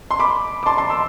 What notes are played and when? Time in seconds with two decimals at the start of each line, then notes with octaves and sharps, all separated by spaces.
0.11 C6
0.19 B5 D6
0.63 D6
0.66 A5 C6
0.77 A5 C6
0.90 C6 E6